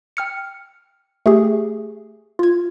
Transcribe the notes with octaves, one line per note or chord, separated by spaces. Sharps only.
G5 F6 C#7
A3 G4 G#4
F4 G#6